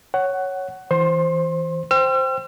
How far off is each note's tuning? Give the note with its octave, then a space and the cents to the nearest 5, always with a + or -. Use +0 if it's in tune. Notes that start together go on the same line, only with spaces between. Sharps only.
C#5 +0 F#5 +15
E3 -15 C5 +5 C6 +30
C5 +0 G5 +0 E6 +45